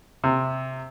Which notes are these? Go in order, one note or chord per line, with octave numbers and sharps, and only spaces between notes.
C3